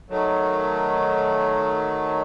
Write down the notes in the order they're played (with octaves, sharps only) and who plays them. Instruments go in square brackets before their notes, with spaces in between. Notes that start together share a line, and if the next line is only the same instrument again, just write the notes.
[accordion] D#3 F#3 A3